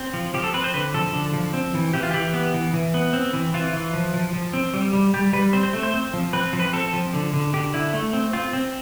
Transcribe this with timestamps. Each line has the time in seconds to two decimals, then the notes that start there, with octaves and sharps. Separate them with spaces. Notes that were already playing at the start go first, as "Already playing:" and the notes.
Already playing: C4
0.14 F3
0.34 F3 G4
0.44 A4
0.54 C4 B4
0.64 C5
0.74 D3 B4
0.94 F3 A4
1.13 D3
1.33 F3
1.54 C4
1.74 E3
1.93 E3 G4
2.03 F4
2.11 E3 G4
2.34 B3
2.54 E3
2.73 E3
2.94 B3
3.13 C4
3.33 E3
3.54 E3 F4
3.73 E3
3.94 F3
4.14 F3
4.33 F3
4.54 C4
4.74 G3
4.93 G3
5.14 G3 G4
5.33 G3 B4
5.53 C4 C5
5.63 C5
5.73 A3
5.83 C5
5.94 C4
6.13 F3
6.33 C4 B4
6.53 F3
6.60 B4
6.73 C4 A4
6.94 F3
7.14 D3
7.34 D3
7.53 D3 G4
7.73 D3 E4
7.94 A3
8.13 C4
8.33 C4 F4
8.53 C4